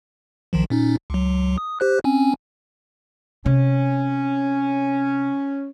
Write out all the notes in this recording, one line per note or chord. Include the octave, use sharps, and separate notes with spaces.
B1 D#3 F3
A#2 C#4 D#4
C#2 F#3
D#6
G4 C5 F#6
C4 C#4 G#5
C3 C#4